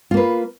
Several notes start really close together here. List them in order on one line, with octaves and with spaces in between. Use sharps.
F4 A#3 B4